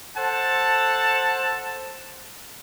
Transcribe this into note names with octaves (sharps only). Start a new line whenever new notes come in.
A4 C5 F#5 A5